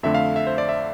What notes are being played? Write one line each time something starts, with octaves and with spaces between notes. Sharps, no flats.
F2 D3 A3 E5
F5
E5
C5
D5
E5